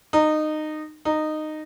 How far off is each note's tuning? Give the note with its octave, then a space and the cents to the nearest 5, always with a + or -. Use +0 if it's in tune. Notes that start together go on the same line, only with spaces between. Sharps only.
D#4 -20
D#4 -15